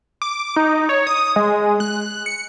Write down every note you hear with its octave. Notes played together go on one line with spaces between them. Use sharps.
D6
D#4
C#5
D#6
G#3
F#6
C#7